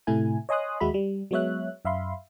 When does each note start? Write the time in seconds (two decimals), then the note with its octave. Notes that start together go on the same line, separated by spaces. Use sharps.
0.07 A2 C3 A3 E4 G#5
0.49 C#5 D#5 G#5 C6 D#6 F#6
0.80 D#2 G#3 F#4 E5 B5
0.94 G3
1.31 F#3 G#3 B3 C#5 E5 F#6
1.85 F#2 E5 F5 B5 C6